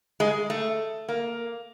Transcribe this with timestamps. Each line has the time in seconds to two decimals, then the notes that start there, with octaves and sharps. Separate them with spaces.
0.20 G#3
0.50 A3
1.09 A#3